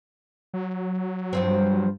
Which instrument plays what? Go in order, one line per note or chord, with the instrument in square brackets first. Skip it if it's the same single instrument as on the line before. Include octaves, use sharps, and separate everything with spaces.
[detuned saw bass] F#3
[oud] G2 F3 C4